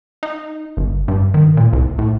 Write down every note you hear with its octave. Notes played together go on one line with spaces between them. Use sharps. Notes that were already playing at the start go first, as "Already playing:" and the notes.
D#4
G1
G2
D#3
A#2
C2
A2